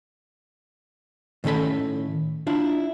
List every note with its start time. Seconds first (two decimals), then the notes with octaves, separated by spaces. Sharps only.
1.44 A2 D#3 C#4 A4 B5
2.47 D4 E4 F4